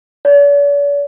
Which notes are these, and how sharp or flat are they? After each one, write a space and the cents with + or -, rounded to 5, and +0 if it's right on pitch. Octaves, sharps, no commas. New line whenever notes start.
D5 -45